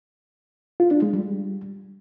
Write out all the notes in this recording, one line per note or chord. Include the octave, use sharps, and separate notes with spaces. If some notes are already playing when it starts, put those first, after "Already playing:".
F4
D4
G#3
G3